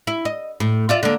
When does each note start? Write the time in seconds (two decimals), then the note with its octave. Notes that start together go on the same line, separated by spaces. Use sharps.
0.07 E4
0.25 D#5
0.60 A2
0.89 F4 D5 E5
1.03 D3 A#3